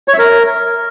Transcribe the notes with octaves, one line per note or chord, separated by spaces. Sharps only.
C#5
E5
A#4